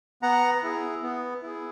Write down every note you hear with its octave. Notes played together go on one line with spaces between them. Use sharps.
B3 F#5 A#5
E4 G#4
B3
E4 G#4